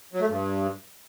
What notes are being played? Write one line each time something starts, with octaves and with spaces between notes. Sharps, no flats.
F#3
A3
G2